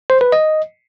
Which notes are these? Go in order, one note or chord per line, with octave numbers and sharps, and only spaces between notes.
C5
B4
D#5